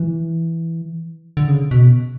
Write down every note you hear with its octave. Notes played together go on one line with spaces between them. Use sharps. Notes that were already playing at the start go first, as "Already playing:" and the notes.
Already playing: E3
D3
C#3
B2